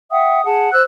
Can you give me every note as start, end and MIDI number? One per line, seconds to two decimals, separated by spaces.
0.11 0.44 76
0.11 0.44 78
0.11 0.44 79
0.11 0.44 87
0.45 0.72 68
0.45 0.72 78
0.45 0.72 81
0.73 0.83 72
0.73 0.83 88
0.73 0.83 90